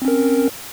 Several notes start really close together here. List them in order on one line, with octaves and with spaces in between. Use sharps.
C4 C#4 A#4